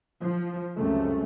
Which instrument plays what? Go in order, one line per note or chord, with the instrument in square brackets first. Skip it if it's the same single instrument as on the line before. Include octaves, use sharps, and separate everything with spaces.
[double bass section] F3
C#2 F#2 C3 A3